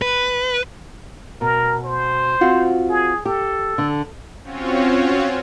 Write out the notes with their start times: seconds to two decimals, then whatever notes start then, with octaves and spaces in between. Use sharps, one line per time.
0.02 B4
1.41 B2 A#4
1.85 C5
2.41 C4 F4 F#4
2.89 G#4
3.26 G4 A4
3.78 D3
4.43 C4 C#4 F4 F#4 C#5